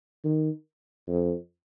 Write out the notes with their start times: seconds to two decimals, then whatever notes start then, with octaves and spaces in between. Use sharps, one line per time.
0.25 D#3
1.08 F2